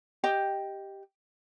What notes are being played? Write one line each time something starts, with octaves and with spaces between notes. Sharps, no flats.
G4 D#5 G5